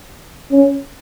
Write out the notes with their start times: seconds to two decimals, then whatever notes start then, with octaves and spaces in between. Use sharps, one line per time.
0.52 C#4